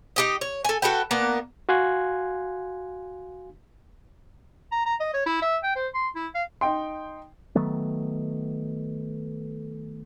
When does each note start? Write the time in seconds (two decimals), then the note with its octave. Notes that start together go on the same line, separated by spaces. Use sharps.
0.16 D#4 G4 D#5
0.41 C#5
0.65 A4 G#5
0.82 F#4 A4 B4 G5
1.11 A#3 B3 D4
1.69 F#4 F5 G#5 C6 F#6 G#6
4.72 A#5
4.86 A#5
5.00 D#5
5.14 C#5
5.26 E4
5.42 E5
5.63 G5
5.76 C5
5.94 C6
6.15 E4
6.35 F5
6.61 D#4 G5 C6
7.55 D#3 F#3 A3 B3